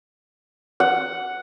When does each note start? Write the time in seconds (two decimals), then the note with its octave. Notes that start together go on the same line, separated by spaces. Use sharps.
0.80 F#5